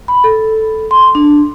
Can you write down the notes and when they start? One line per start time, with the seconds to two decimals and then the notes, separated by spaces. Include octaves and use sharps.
0.08 B5
0.24 A4
0.91 C6
1.15 D4